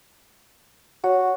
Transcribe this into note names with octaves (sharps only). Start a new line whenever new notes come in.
F#4 C#5